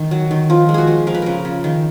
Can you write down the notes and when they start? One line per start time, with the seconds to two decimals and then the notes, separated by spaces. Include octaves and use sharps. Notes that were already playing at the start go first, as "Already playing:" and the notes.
Already playing: D#3
0.11 F#3
0.31 D#3
0.50 F3 F4
0.69 G#3
0.74 F#4 G#4
0.87 F3
1.07 F3 A#4
1.14 B4
1.22 C#3 A#4
1.45 C#3
1.64 D#3